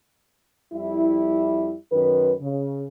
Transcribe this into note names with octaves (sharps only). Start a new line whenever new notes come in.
F2 G3 E4
F#2 D#3 B4
C#3